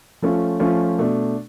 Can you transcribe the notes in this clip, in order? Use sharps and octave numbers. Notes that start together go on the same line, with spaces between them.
F3 A3 C#4 F4
F3 A3 C#4 F4
B2 A3 D4